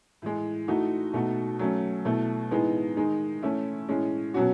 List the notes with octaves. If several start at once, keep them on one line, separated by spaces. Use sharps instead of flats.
A2 E3 G#3
E3 A3 D#4 F#4
B2 A3 D#4 F#4
F#3 A3 C#4
B2 A3 E4
A2 E3 G#3 B3 D#4
D#3 G#3 D#4
E3 A3 C#4 E4
A2 E3 G#3 C#4
B2 F#3 C#4 F#4